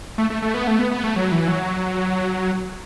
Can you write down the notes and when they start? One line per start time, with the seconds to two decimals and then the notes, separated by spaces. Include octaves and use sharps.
0.18 A3
0.30 A3
0.42 A3
0.54 B3
0.67 A3
0.79 B3
0.91 B3
1.04 A3
1.16 F#3
1.32 E3
1.48 F#3